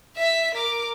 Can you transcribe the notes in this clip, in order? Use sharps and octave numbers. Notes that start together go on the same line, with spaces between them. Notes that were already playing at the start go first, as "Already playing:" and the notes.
E5 B6
A#4 D6